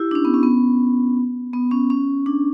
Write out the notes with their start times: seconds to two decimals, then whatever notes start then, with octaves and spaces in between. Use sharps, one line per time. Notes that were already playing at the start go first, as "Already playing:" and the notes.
Already playing: E4 G4
0.11 D4
0.15 C#4
0.25 B3
0.34 C#4
0.43 B3
1.53 B3
1.71 C#4
1.90 C#4
2.26 D4